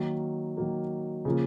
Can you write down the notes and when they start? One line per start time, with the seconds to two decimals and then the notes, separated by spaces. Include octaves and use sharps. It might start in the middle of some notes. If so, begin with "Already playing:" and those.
Already playing: D#3 F#3 A#3
0.57 D#3 F#3 A#3
1.25 C#3 F3 A#3